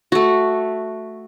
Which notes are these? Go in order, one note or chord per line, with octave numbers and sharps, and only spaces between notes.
A3 F#4